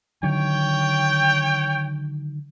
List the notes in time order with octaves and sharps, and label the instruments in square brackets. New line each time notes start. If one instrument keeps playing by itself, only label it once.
[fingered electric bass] D3 D#3 F#3 [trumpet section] C#5 G5